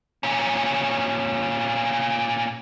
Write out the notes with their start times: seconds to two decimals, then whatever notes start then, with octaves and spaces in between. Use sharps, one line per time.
0.23 A#2 C#4